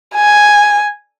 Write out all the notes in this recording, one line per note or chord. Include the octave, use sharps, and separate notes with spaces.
G#5